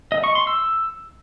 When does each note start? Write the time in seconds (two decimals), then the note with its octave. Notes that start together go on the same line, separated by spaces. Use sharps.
0.12 D#5
0.24 C#6
0.35 C6
0.47 E6